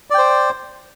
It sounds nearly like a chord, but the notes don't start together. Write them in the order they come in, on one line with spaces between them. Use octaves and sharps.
D5 G5 C5